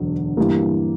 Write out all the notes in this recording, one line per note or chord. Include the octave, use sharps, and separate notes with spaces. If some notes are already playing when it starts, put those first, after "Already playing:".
Already playing: E1 D2 D3 F#3
G2 E3 G3 A#3